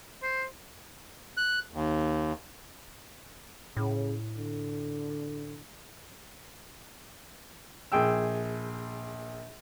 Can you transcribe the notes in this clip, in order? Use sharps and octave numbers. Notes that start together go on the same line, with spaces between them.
C5
F#6
D#2
A2 C#3
D3
A#1 G#4 G5 E6